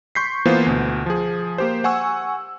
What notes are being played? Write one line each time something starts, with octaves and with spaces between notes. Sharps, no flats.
C6 C#6 G6 B6 C7
E3 A#3 B3 F4 C5
D2 B2
F3 G#4
A#3 G4 C5
F#5 G#5 C#6 E6